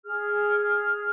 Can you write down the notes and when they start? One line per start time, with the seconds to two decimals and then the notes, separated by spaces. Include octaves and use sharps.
0.06 G#4 F6